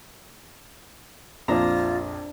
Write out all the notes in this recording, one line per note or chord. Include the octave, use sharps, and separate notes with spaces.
A#1 F2 D4 F4 A#5